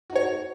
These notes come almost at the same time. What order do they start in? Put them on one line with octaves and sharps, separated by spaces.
F#4 D#4 C#5